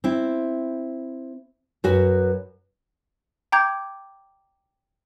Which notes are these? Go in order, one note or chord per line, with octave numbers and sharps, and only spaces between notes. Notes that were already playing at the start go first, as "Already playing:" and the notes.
C4 E4
F#2 F#4 B4
G5 A#5 D6 G6 G#6